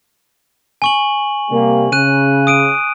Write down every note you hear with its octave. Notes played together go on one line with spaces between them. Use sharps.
G#5 C#6 F#7
C3 G3 A#3
C#3 F#6 D#7
D#6 D7 D#7